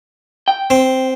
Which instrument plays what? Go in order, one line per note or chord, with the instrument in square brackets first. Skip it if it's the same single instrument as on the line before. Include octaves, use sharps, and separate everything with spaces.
[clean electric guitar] G5
[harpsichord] C4